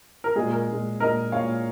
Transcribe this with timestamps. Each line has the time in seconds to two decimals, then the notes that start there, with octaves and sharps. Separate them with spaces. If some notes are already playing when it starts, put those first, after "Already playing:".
0.24 A#4
0.35 A#2 G#3 G#4
0.52 A#4
0.68 A#2 G#3
1.00 A#2 G#3 A#4 D#5
1.32 A#2 G#3 C#5 F5